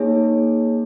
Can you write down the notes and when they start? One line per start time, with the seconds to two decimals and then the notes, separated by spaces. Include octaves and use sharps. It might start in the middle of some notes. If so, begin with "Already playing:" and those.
Already playing: A#3 D#4 G#4 C#5